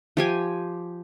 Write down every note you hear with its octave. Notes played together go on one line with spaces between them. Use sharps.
F3 G4 G#5